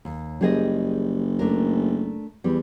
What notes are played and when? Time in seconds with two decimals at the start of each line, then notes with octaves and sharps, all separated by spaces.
0.05 D#2
0.41 F#1 G3 G#4 D#5
1.39 A3 D4 A#4
2.44 E2 G3